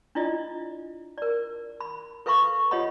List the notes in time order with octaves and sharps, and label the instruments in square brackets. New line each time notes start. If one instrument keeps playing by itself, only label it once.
[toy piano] D4 E4 F4 D5 D#5
A#4 D5
B5
A4 B4 E5 F5 B5 C#6
F4 G4 C#5 D#5 F#5 B5